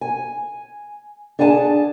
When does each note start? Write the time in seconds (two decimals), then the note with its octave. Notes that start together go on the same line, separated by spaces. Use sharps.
0.01 G#5
1.39 D4 G#4 F#5 G#5 A5